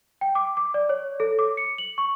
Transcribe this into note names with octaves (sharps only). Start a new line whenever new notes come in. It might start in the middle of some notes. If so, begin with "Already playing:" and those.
G5
D6
D6
D5
C#5
A4
D6
C#7
F#7
C#6